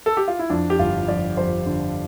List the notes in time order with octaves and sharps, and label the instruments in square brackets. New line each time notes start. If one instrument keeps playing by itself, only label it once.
[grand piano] A4
G4
F4
E4
F2 D4
G4
G1 F4
F2 D5
F2 C5
D3